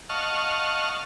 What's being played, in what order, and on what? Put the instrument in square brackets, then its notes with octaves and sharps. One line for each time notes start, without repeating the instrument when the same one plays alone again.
[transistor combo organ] D#5 F5 F#5 A5 C#6 F6